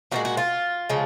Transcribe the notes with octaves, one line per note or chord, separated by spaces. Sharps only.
A#2 F3 G#3 F#4
F#4
F4
C#3 F3 G#3